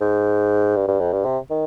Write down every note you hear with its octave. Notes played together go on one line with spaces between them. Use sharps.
G#2
G2
G2
F2
G2
C3
D#3